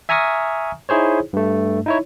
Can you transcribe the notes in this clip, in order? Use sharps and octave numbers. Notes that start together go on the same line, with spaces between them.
E5 G#5 A#5 C#6 D#6 F6
D#4 E4 G#4 C5 C#5
G2 A3
D#4 E4 C#5